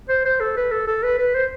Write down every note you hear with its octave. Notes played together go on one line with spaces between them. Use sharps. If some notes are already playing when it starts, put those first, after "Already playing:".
C5
C5
A4
B4
A4
A4
B4
B4
C5